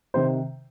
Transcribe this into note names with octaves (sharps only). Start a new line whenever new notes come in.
C3 D#3 C5